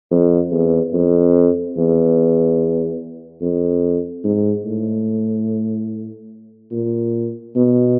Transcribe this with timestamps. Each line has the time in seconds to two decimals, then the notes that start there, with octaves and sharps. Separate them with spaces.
0.11 F2
0.52 E2
0.93 F2
1.77 E2
3.42 F2
4.25 G#2
4.65 A2
6.72 A#2
7.56 B2